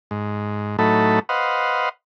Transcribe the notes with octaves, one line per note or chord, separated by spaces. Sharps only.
G#2
A2 F#3 A3 D#4 A4 B5
B4 C5 D#5 F5 F#5